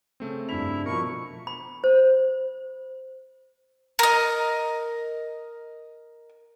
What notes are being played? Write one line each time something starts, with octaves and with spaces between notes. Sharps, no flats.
C#3 A3 C4
G2 E4 E5 F7
B2 F3 E4 A#4 C#6
B5
C5
A#4 D#5